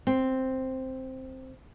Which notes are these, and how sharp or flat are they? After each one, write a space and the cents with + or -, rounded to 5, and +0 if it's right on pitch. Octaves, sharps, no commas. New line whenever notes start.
C4 +0